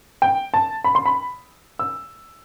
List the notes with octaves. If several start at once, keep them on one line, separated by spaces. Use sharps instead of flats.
G5
A5
B5
C6
B5
E6